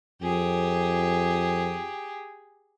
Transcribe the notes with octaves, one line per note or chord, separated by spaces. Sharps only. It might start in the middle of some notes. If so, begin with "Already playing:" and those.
F2 G4 G#4